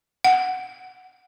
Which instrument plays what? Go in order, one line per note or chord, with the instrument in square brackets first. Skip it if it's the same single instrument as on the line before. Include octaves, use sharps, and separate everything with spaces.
[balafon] F#5